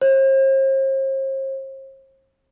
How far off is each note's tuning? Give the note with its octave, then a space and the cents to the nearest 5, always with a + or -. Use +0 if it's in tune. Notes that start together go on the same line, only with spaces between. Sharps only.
C5 +45